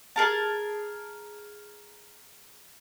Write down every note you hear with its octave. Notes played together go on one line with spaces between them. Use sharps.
G#4 A#4 A5